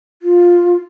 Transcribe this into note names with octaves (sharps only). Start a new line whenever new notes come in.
F4